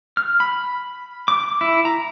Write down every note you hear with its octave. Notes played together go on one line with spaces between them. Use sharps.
F6
B5
D6
E4
A#5